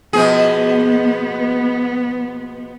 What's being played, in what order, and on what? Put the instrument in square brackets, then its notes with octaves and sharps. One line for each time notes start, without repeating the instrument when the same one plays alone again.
[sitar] B2 F3 G#4 [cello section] B3